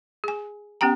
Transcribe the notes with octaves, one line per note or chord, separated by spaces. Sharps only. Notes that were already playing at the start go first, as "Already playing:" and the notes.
G#4 G#5
B3 C#4 G4 G5 A#5